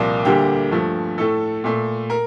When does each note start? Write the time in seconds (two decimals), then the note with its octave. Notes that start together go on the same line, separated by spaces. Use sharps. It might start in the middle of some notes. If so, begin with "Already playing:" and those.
Already playing: C2 A#2 F3 A#3 D5
0.25 D2 D3 G3 A#3 G4
0.71 G2 F3 A3
1.18 A2 A3 A4
1.64 A#2 A3
2.10 A#4